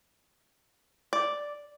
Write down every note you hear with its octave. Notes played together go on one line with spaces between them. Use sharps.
D5